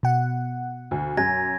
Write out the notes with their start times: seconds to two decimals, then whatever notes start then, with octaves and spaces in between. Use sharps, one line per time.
0.03 B2 F#5
0.91 D2
1.17 F#2 G#5 G#6 A#6